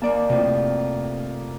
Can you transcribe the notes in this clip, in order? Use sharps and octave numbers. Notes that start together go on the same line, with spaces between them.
D#2 A#3 D5 A5
F2 A2 C3